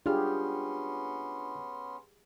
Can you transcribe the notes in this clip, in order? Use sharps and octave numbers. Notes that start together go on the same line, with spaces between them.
B3 C#4 D4 F4 G4 G#4 C6 F6